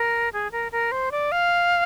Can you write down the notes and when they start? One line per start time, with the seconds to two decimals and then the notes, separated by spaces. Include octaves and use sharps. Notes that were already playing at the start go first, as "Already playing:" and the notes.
Already playing: A#4
0.33 G#4
0.52 A#4
0.72 A#4
0.92 C5
1.11 D5
1.32 F5